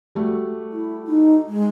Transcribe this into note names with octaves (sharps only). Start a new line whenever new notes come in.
G3 A3 F#4
E4
D#4
G#3